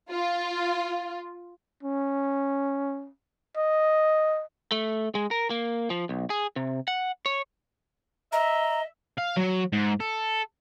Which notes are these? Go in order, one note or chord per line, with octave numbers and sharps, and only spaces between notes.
F4
C#4
D#5
A3
G#3
A#4
A#3
F3
B1
G#4
C3
F#5
C#5
D#5 E5 A#5
F5
F#3
G#2
A4